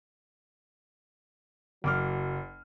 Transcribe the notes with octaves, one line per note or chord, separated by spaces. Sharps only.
F#1 F#3 D6 F6